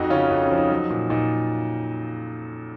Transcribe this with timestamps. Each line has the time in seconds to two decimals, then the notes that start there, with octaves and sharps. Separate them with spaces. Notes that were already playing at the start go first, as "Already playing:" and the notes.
Already playing: F2 D#4 F#4
0.10 C#3 C#4 F4
0.30 F2 D#4
0.44 C#4
0.51 F3
0.58 D#4
0.71 F#3
0.90 A#2
1.10 A#2 D#4